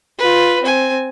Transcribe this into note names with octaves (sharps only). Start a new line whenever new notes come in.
F4 B4
C4 G#5